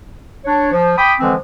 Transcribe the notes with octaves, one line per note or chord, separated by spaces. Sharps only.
D4 C#5
F3
G5 B5 D6 D#6
D3 E3 F3 G#3 C4